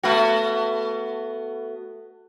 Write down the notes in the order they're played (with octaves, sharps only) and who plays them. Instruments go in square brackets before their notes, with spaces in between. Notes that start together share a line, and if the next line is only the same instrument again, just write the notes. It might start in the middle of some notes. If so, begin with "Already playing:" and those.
[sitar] A3 B3 F#4